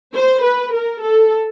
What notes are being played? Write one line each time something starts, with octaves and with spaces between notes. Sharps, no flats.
C5
B4
A#4
A4